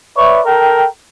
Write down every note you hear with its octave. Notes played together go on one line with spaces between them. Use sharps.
B4 C#5 D5 E5 C#6
A4 A#4 G5